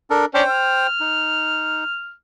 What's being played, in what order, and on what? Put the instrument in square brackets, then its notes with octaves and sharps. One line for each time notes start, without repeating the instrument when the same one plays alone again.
[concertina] D4 A4 A#4
[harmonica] C#4 D4 [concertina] C5 G5
[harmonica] F6
[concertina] D#4